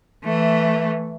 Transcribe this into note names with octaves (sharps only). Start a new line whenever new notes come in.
E3 A3